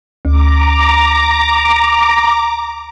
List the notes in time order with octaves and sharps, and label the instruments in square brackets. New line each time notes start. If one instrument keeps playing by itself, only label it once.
[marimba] D2 [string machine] A#5 D6